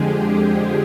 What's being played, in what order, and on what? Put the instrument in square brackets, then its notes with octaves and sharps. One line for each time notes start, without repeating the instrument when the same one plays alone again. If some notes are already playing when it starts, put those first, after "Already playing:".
Already playing: [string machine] F2 D3 F3 G#3 G4 G#4